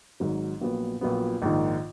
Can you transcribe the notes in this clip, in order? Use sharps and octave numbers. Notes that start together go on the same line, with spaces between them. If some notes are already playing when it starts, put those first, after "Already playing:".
G#1 G#2 F#3
A#1 A#2 F#3 B3
A#1 A#2 F#3 B3
A#1 G#2 D#3